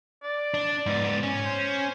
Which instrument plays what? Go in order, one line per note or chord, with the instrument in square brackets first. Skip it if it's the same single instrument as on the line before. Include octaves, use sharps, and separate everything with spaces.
[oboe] D5
[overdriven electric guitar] D4
G#2 B3
C#4
[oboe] C5